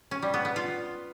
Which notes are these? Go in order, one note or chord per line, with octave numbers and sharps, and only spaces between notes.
C#4
G3
B3
B3
F4